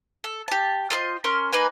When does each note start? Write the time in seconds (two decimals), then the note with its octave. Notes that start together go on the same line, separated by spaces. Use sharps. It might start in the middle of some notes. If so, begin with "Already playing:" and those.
0.24 A4
0.48 G4 A5
0.90 F4 A4 C5 D#5
1.24 C#4 A#4 C6 F6
1.52 A#3 D#4 B4 G#5